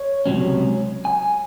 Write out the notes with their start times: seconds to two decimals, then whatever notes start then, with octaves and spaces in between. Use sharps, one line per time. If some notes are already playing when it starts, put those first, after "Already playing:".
Already playing: C#5
0.26 C#2 C3 F#3 C#4
1.05 G#5